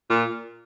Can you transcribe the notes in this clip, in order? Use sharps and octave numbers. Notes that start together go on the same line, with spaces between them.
A#2